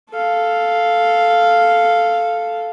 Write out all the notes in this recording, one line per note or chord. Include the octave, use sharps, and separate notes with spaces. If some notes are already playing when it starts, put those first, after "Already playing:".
A4 F5